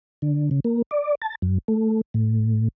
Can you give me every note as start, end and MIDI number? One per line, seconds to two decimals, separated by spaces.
0.22 0.49 50
0.51 0.60 49
0.65 0.82 58
0.91 1.15 74
1.22 1.35 81
1.42 1.58 42
1.68 2.01 57
2.14 2.68 45